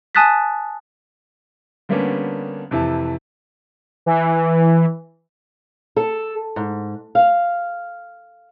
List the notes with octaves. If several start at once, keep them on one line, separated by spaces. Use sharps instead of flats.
G#5 A5 D#6 F#6 A6 B6
D3 G3 A#3 B3 C#4 D4
F2 C3 E3 E4 A5
E3
A4
G#2
F5